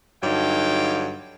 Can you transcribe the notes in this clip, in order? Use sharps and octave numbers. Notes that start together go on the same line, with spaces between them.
G2 D3 F#3 D#4 F5 G5